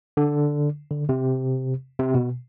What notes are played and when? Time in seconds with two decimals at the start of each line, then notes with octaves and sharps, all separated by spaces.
0.17 D3
0.91 D3
1.09 C3
2.00 C3
2.14 B2